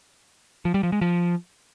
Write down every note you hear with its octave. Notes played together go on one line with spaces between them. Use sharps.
F3
G3
F3
G#3
F3